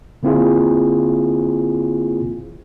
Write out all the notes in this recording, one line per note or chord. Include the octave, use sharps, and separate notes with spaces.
D3 A#3 C4 E4 F4 G#4